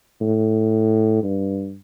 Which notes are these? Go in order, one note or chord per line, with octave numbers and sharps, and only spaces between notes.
A2
G2